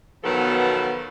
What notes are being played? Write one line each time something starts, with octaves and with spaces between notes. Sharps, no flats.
B2 D#3 F3 F#3 B3 A4